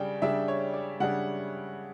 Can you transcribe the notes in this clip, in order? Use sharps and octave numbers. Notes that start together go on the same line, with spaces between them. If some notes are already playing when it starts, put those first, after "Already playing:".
Already playing: C#3 G3 D4 G5
C#3 G3 D4 E5
C#5
D5
C#3 G3 D4 F#5